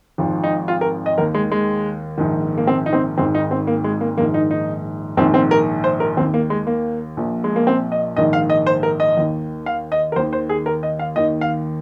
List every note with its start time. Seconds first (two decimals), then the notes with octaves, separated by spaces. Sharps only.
0.18 G#1 G#2 F3
0.44 D#4
0.68 F4
0.81 A#4
1.06 D#5
1.18 D#2 D#3 A#4
1.34 G#3
1.52 G#3
2.18 A#1 G#2 D#3
2.58 A#3
2.67 C4
2.86 D#4
2.93 C4
3.18 G#1 G#2 D#3 C4
3.35 D#4
3.51 C4
3.67 A#3
3.84 G#3
4.01 A#3
4.17 A#1 G#2 D#3 A#3
4.34 D#4
4.51 D#4
5.17 A#1 G#2 D#3 C4
5.34 C4
5.51 A#4
5.84 C5
6.00 A#4
6.17 D#2 C4
6.21 D#3
6.34 A#3
6.50 G#3
6.67 A#3
7.17 A#1 A#2 F3
7.44 G#3
7.56 A#3
7.67 C4
7.92 D#5
8.16 A#1 G#2 D#3 D#5
8.33 F5
8.50 D#5
8.66 C5
8.83 A#4
9.00 D#5
9.17 D#2 D#3
9.66 F5
9.92 D#5
10.12 A#4
10.16 D#2 C5
10.19 D#3
10.33 C5
10.49 G#4
10.66 A#4
10.83 D#5
10.99 F5
11.16 D#2 D#3 D#5
11.41 F5